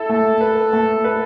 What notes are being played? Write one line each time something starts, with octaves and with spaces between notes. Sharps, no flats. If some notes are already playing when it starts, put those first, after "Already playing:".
Already playing: E4 A4
A3
B4
A3
B4